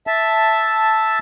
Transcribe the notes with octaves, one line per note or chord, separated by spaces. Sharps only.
E5 A5